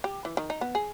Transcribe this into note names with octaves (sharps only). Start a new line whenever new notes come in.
G4
E3
D#3
D#4
B3
G#4